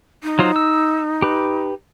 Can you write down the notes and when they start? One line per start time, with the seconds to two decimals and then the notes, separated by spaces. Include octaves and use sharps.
0.24 D#4
0.39 F#3 F4 C5
0.56 E6
1.22 G4 B4